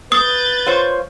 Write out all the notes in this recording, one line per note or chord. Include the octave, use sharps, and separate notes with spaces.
B4 D#6 G6 A6
F4 C5 C#5